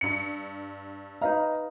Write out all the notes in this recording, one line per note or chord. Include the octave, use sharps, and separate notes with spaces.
G2 C#7
D#4 B4 D#5 F5 A#5